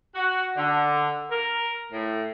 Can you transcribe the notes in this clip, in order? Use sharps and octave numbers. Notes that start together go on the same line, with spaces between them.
F#4
D3
A#4
A2